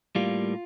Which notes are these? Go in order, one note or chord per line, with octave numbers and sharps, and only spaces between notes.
A2 G3 A#3 F4